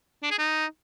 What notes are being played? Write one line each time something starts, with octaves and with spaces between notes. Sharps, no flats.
D4
G#4
D#4